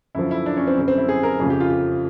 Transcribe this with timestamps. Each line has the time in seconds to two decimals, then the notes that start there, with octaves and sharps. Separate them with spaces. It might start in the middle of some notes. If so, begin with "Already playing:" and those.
0.15 F#2 D3 F3 E4
0.31 E4
0.46 D4
0.57 C#4
0.67 C4
0.77 F#2 D3 G3
0.88 C4
0.98 E4
1.09 G#4
1.23 A#4
1.40 F2 C#3 F3 A3 G#4
1.50 G4
1.60 F4
1.70 G4